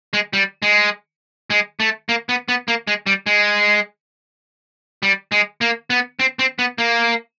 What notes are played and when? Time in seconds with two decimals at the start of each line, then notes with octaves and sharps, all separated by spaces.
0.13 G#3
0.33 G3
0.62 G#3
1.50 G#3
1.80 A3
2.09 A#3
2.29 B3
2.49 B3
2.68 A#3
2.87 G#3
3.07 G3
3.26 G#3
5.03 G3
5.32 G#3
5.61 A#3
5.90 B3
6.20 C4
6.39 C4
6.59 B3
6.78 A#3